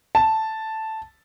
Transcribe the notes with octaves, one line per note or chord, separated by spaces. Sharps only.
A5